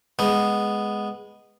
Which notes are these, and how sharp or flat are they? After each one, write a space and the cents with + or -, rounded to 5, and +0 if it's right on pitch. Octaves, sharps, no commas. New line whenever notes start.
G#3 +0 B3 +0